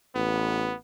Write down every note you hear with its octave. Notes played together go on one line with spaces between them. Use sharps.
A1 B3